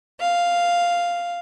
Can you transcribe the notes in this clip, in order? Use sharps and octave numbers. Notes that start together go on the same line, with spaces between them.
F5